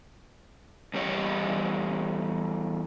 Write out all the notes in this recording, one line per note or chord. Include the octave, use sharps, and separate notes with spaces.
E2 G3 G4 C#5 D#5